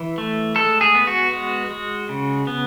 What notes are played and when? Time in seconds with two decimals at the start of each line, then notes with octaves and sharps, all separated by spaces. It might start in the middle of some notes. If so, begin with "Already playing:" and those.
Already playing: E3
0.18 A3
0.56 G#3 A4
0.81 G#4
0.95 B3
1.07 F#4
1.32 G#3
1.71 G#3
2.09 C#3
2.47 B3